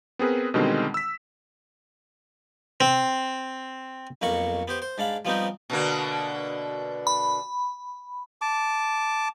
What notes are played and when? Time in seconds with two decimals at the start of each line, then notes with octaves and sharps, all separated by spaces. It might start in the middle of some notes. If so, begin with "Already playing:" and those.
0.19 B3 C4 G#4 A#4 B4
0.54 B2 D3 D#3 G3 G#3 C4
0.94 E6 B6
2.80 C4
4.21 B1 F2 A#3 F#4 B5 C#6
4.68 B3 G4 C5
4.82 C5
4.98 G#2 D4 F5 B5
5.25 F3 G3 B3 C4 D#4 G4
5.70 B2 D3 A#3
7.07 B5
8.41 A5 D6